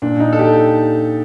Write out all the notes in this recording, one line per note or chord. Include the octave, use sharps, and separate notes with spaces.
A#2 D4
D#4
A4
G4